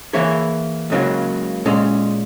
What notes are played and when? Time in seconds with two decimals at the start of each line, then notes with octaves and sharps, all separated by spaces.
0.13 E3 A#3 E4 G#4 C#5
0.90 C#2 C#3 F#3 A#3
1.66 A#2 G#3 C#4